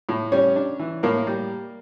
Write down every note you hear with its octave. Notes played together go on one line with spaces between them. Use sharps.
A2
G3 C#4 C#5
D4
E3
A2 A#3 A#4
G3